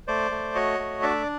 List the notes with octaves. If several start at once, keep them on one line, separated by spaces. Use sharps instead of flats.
A3 C5 D5
A3
F#4 C#5 D#5
A3
D4 D5 E5